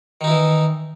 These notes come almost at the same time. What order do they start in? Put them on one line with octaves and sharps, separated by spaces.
D#3 D#4 E4 E3